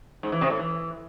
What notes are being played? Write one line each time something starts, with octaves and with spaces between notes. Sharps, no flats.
G#2
E3
C3
A2
E3